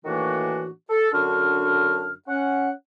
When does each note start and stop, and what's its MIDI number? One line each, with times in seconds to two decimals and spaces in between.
0.05 0.70 45
0.05 0.70 51
0.05 0.70 52
0.05 0.70 58
0.05 0.70 62
0.05 0.70 66
0.90 1.09 69
1.13 2.12 42
1.13 2.12 50
1.13 2.12 62
1.13 2.12 66
1.13 2.12 89
2.28 2.70 61
2.28 2.70 78